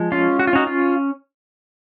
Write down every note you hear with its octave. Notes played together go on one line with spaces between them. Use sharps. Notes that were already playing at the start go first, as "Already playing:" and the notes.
Already playing: F3 G#3
C#4 F4
F#4
F4
C#4 D#4 F#4
F4